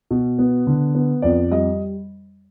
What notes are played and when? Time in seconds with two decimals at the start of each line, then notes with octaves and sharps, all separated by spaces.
0.11 B2
0.39 B3
0.67 D3
0.95 B3
1.22 F2 D5
1.51 G3 D#5